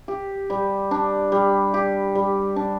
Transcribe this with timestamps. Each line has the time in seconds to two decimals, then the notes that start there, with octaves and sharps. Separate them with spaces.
0.08 G4
0.50 G3
0.91 D4
1.32 G3
1.74 G4
2.15 G3
2.56 D4